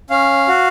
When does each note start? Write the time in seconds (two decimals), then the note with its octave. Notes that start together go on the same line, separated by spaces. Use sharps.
0.10 C#4 F5
0.48 F#4